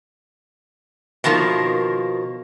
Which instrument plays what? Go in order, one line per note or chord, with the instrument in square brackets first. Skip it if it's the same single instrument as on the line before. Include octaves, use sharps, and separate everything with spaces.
[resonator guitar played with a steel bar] B2 D#3 F3 A#3